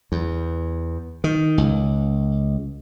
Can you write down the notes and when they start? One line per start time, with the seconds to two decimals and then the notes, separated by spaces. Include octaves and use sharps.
0.12 E2
1.24 D#3
1.58 C#2